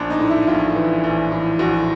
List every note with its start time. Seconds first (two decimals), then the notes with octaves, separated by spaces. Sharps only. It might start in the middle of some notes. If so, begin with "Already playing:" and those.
Already playing: A#1 D4
0.10 D#4
0.20 A2
0.30 E4
0.47 A#1 F4
0.75 E3
1.04 A#1
1.32 A2
1.59 A#1 F#4